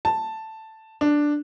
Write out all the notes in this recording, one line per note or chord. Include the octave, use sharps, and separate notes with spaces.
A5
D4